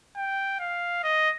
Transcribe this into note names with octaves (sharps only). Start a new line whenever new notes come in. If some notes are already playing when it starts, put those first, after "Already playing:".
G5
F5
D#5